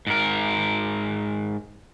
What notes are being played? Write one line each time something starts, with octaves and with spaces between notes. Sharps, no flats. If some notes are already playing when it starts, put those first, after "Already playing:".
G#2 A#4